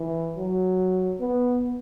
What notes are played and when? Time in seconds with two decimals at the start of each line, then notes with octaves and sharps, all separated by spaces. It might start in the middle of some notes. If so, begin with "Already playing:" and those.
Already playing: E3
0.36 F#3
1.21 B3